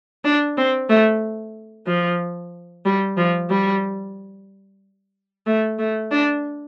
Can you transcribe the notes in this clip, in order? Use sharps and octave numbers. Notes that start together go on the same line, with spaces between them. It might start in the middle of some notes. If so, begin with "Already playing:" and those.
D4
C4
A3
F3
G3
F3
G3
A3
A3
D4